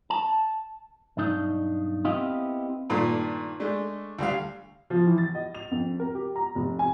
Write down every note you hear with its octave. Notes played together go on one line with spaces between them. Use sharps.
A5
B1 G2 D4 D#4
B3 C4 E4 G4 D#5 F5
G2 A#2 D#3 A3
G#3 A3 D4
D2 G3 F5
F3
E3
A6
D#5
F7
F2
A#4
G4
A#5
F1
G#5